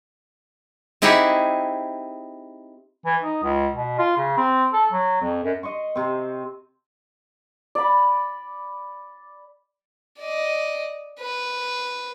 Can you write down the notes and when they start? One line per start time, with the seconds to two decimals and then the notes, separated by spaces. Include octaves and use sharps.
1.02 C4 D#4 E4 G4 G#4 F#5
3.05 E3
3.23 D#4
3.43 C#2
3.74 B2
3.98 F4
4.17 C#3
4.38 C4
4.73 A4
4.92 F#3
5.22 F2
5.44 F#2
5.63 D#5 C6 C#6
5.95 C3 C4
7.75 D5 B5
10.20 D5 D#5
11.20 B4